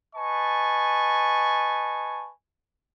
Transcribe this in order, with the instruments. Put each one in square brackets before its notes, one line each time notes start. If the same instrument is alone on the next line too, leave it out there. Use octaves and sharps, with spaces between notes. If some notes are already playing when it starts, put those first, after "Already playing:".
[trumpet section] B4 D#5 G#5 A5 C#6